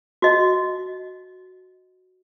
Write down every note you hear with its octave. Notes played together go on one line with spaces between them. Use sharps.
F#4 D#5